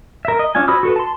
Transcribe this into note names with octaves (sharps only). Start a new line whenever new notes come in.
A#4 E5
D#5
C#4 D4 F4 G#5
F#4 C5 B5 D#6 E6
F#4 A4 B4
A5 C6